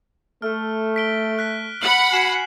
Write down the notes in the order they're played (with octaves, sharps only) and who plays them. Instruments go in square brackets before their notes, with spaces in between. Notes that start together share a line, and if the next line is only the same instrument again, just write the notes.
[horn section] A3 [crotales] F6
[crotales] B6 D7 G7
F#6 B6
[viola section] F#5 B5 [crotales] F#7
[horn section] F#4 G#5 [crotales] C7 E7